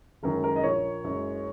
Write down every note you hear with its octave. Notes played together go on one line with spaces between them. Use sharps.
F#1 F#2 D#3 G#3 A#4
A#4
D#5
A#1 A#2 A#3 C#5
F#1 F#2 C#3 G#3